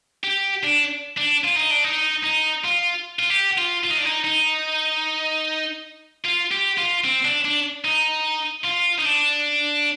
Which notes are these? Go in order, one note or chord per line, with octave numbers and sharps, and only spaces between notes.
G4
D4
D4
F4
D#4
D4
D#4
D#4
F4
F4
G4
F4
F4
D#4
D4
D#4
D#4
F4
G4
F4
C4
D4
D4
D#4
F4
D#4
D4